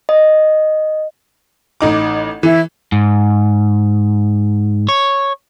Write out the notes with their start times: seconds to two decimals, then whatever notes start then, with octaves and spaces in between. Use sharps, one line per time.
0.09 D#5
1.81 A1 D#4 D6
2.43 E3 E4
2.92 G#2
4.89 C#5